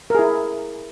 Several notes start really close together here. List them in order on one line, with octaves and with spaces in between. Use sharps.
A#4 G#4 E4